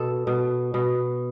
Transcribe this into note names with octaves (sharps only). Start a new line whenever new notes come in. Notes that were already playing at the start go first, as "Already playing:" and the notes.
Already playing: B2 A4
B2
B2